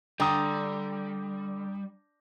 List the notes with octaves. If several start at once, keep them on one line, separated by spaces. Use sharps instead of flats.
D3 G3 G5 A#5 D#6